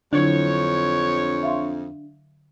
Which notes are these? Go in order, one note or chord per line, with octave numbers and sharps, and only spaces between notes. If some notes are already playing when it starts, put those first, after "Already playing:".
F2 D3 F#3 D4 E4 C#5
E5 F5 C6